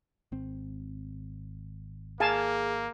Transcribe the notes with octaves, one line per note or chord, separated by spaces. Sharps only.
G#1 C4
A#3 G#4 F5 G#5 A5